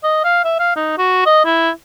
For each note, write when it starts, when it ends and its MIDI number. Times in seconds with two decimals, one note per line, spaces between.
0.04 0.21 75
0.24 0.43 77
0.44 0.57 76
0.59 0.71 77
0.76 0.97 63
0.98 1.24 66
1.26 1.44 75
1.45 1.70 64